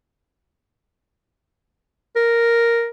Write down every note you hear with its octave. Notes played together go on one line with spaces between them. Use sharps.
A#4